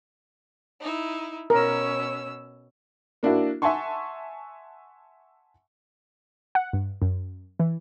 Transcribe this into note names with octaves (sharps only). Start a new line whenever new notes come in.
D#4 E4
B2 C#4 A#4 E6
A#3 D4 E4 F#4
E5 F#5 G#5 A5 C6 C#6
F#5
G2
F#2
E3